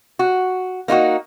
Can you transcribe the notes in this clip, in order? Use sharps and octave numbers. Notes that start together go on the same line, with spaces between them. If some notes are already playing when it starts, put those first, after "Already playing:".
F#4
A#3 D#4 F4 F#4